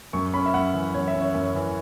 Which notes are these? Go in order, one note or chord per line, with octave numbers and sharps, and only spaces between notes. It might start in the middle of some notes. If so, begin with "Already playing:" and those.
F#2 C#6
C#4 B5
E5
F#2 F#5
E3
F#2 C#5
E5
C#4
C#5
F#2
E3